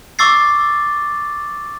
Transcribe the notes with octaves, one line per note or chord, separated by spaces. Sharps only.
C#6 D6 E6 A6 C7